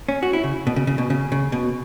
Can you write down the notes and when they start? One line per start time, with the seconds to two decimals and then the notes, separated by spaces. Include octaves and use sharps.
0.09 C#4
0.23 F#4
0.33 E4
0.44 C#3
0.67 B2
0.76 C#3
0.87 C#3
0.98 B2
1.10 C#3
1.32 C#3
1.52 B2